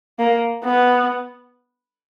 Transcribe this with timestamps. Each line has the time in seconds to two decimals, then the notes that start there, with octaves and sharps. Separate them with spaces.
0.19 A#3
0.64 B3